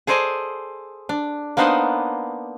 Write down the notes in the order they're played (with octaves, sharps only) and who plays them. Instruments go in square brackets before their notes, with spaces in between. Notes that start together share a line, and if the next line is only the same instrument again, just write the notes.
[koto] G#4 A4 C5 D5 D#5 G#5
D4
A#3 B3 D4 D#4 C5 F#5